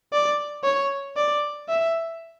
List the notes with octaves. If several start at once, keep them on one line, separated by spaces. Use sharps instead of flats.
D5
C#5
D5
E5